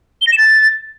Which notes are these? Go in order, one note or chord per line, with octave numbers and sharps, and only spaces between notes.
G7
A#6
E7
A6